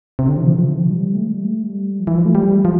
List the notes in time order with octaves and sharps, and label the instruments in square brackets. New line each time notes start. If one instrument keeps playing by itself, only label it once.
[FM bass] C3
D3
E3
F3
C3
D3
E3
F3
G3
A3
G3
A3
G3
F3
E3
F3
A3
G3
F3